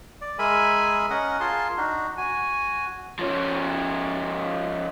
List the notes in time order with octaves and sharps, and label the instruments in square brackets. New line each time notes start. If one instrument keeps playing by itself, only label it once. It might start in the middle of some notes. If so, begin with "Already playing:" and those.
[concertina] D5
G#3 G#4 A#4 E5 G#5 B5
C#4 A#4 D#5 F#5
F4 G#4 A#4 A5 C6
D4 D#4 F#4
F#4 G#5
[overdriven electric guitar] F3 C#4